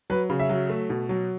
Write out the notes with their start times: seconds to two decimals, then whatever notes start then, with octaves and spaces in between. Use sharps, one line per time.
0.10 F#3 B4
0.30 C#3
0.40 E5
0.49 F#3
0.70 A3
0.90 B2
1.09 F#3